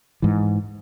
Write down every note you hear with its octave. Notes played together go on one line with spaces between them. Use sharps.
G#2 E3